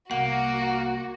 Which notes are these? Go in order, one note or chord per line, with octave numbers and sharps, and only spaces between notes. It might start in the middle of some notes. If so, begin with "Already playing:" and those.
C2 A#3 F#4 F#5